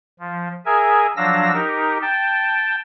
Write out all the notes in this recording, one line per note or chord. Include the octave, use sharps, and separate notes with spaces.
F3
G#4 A#4 E5 G#5
F3 F#3 D4 F5 E6 A#6
D#4 G4 A#4
G5 A5